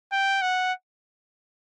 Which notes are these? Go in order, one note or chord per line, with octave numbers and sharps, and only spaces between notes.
G5
F#5